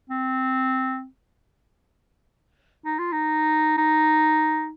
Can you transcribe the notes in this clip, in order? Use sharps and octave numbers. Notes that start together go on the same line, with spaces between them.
C4
D#4
F4
D#4
D#4